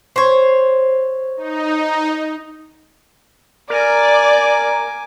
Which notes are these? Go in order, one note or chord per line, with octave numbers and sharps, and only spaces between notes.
C5 C#5
D#4
A#4 D5 G#5 D6